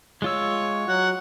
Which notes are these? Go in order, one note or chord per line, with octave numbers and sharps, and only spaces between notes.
G#3 F4 C#5 E6
F#3 F#5